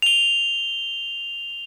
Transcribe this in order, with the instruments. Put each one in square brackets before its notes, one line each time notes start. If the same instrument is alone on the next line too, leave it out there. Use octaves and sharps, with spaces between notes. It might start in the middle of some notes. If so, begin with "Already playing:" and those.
[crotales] F7 G7